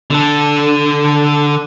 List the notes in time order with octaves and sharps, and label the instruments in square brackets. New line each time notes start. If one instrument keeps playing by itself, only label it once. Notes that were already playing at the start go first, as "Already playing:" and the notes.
[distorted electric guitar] D3 A4